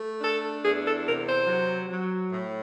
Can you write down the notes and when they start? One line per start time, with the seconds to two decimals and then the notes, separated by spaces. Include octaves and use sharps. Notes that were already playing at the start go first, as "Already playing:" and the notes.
Already playing: A3
0.21 D4 A4
0.63 E2 G#4
0.84 A4
1.05 C3 A#4
1.27 C5
1.47 F#3
1.89 F#3
2.32 A2